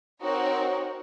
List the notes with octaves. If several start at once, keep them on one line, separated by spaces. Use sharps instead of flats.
C4 D#4 F#4 A#4 C#5